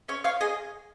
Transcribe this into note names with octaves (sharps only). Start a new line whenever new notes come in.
C#4 C#5
C#5 F5
G#4 D#5 G#5